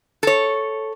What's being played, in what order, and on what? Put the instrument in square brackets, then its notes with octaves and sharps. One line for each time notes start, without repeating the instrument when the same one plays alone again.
[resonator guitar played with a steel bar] A4 C#5